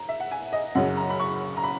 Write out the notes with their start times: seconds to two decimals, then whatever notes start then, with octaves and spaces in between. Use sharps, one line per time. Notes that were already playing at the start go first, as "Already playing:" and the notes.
Already playing: A#5
0.09 E5
0.20 F#5
0.31 G#5
0.53 D#5
0.75 F#2 C#3 F#3 F#5
0.97 A#5
1.10 B5
1.20 C#6
1.57 A#5
1.64 B5